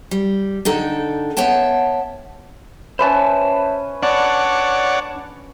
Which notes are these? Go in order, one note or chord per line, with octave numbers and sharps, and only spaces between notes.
G3
D3 D#4 A4 G5
B3 C#5 E5 G5 A5
C#4 B4 C5 E5 A5 B5
D4 C#5 D5 F#5